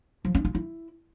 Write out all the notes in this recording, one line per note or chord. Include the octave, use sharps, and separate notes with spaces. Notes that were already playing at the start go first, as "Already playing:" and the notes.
F3
C#4
F4
E4